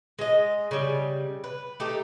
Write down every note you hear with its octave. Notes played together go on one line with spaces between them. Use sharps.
G#3 D#5
C#3 G3
B4
A3 D#4 G4